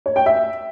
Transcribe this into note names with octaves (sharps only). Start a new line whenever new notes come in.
C#5
G5
E5